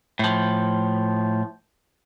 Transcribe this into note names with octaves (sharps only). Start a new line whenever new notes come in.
A2 F3